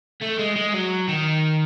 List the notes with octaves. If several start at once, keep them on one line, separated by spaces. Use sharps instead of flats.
A3
G#3
G#3
F#3
D#3